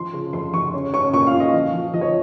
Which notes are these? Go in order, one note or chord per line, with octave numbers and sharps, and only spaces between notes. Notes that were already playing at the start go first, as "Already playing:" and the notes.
Already playing: F3 C6
C#3
F2 C6
F2 C#6
C#4
C#4 C#6
A#2 C#6
F5
F4
D#5
F3
F3
F3 D#5
C#5